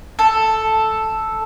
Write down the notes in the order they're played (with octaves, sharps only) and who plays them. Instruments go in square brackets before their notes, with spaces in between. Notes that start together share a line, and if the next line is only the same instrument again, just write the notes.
[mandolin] A4